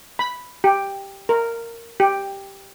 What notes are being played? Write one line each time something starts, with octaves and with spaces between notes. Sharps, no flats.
B5
G4
A#4
G4